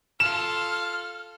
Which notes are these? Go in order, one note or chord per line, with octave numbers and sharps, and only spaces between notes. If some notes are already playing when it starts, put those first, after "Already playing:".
F4 A4 F6 E7